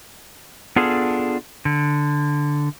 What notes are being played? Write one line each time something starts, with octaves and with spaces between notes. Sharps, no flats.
B3 D4 F4 G#4 A4
D3